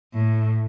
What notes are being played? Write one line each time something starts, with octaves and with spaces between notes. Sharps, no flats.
A2